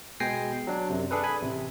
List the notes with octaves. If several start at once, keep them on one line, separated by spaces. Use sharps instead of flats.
B2 G#3 G5 G#5 A#6 C7
F#3 D4
F#2 C3
D4 G#4 A4 B4
G#5 B5
A1 C3